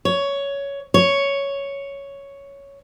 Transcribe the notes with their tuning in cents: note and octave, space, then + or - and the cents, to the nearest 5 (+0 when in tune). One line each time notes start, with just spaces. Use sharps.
C#5 +10
C#5 +5